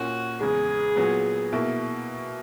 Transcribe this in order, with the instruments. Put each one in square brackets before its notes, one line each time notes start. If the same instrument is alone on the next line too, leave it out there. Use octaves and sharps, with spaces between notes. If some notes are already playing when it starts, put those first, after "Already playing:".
Already playing: [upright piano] A#2 A#3 C#4 [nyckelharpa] F#4
[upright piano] E2 C#3 G#3 [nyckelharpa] G#4
[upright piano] A#2 F#3 B3
B2 A#3 E4